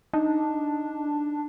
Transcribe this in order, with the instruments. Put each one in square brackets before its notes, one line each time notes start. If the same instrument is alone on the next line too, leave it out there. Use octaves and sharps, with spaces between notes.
[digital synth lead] D4 [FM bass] D#4